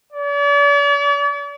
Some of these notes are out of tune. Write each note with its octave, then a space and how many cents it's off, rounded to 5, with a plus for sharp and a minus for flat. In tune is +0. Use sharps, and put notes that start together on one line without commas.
D5 -45